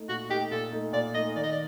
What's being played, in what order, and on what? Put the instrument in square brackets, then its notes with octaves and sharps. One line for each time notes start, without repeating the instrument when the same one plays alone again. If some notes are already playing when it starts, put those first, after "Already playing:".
Already playing: [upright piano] A3 D#4
[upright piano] A#2 [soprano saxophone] F#4
[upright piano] A3 D#4 [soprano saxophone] G4
[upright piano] A#2 [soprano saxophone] A4
[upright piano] A3 D#4
[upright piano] A#2 [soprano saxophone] D5
[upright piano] A3 D#4 [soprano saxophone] D#5
[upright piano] D#3 [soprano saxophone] D5
[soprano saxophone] D#5
D5